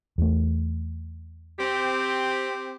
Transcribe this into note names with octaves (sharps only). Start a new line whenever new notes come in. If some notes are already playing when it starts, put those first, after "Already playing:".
E2 A3
C4 G4